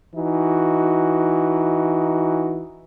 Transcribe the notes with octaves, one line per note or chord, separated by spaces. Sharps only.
E3 D#4 F#4